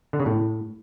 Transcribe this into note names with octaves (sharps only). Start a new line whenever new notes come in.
D3
C#3
A2